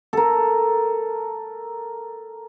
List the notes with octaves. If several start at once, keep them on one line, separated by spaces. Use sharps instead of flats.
A4 A#4